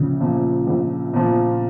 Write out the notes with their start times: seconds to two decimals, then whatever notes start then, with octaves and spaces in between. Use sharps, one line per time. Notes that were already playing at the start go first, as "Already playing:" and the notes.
Already playing: A#1 C#3
0.20 A#2 F3
0.67 A#1
1.14 A#2 F3